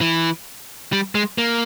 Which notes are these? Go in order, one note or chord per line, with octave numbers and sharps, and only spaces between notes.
E3
G3
G#3
A#3